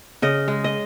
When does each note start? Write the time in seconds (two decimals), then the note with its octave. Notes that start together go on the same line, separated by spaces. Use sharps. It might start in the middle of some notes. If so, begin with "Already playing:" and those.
0.22 C#3 D#5
0.48 G#3
0.64 D#5